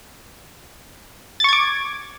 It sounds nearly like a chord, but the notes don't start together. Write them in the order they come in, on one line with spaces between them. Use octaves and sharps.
A6 C#6 G#6 D6